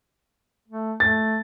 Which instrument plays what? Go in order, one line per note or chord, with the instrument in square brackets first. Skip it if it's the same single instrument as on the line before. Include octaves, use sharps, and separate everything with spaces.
[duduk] A3
[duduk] A3 [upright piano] A6